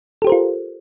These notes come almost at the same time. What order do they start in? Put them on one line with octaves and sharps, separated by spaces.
A4 G4 C5 A#4 F4